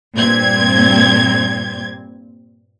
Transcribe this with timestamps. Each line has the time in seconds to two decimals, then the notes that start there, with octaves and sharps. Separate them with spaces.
0.17 G2 A#2 C4 G#6